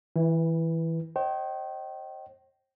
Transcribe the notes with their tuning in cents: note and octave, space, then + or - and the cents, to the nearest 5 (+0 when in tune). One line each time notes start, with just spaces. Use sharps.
E3 -25 E4 +10 B4 +0
C5 +45 D#5 +0 G5 -30